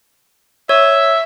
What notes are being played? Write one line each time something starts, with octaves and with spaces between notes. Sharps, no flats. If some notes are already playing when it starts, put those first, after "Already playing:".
C#5 E5